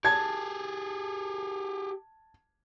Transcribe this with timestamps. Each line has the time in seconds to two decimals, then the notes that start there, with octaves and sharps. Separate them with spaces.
0.04 G4 G#4 A5 G#6